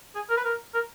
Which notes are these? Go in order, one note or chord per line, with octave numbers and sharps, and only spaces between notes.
G#4
A#4
B4
A#4
A#4